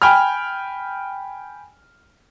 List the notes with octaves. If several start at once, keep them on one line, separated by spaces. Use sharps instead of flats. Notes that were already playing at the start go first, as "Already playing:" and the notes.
G5 G#5 B5 F6